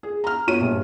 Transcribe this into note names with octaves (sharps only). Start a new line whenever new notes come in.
G#4
A#5 F6
G1 F#4 C#5 D#7
A#1 G2